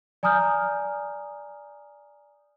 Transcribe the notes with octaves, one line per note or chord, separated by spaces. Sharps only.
D5 G#5 A#5 D#6 F6 G6